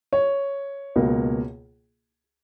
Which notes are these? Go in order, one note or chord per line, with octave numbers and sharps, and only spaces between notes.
C#5
C#2 B2 A#3